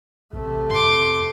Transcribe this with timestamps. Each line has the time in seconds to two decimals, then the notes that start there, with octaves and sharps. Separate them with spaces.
0.33 A1 C3 A3
0.70 F2 C6 D6